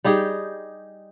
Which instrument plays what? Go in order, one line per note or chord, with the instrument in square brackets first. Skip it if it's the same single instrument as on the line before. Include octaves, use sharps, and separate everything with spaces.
[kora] G3 D#4 G4 G#4